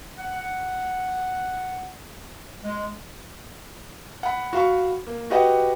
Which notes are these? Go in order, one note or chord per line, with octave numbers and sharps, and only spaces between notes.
F#5
G#3
F#5 B5
F#4 F5 B5 C#6
A#3
F#4 G4 B4 D#5 F#5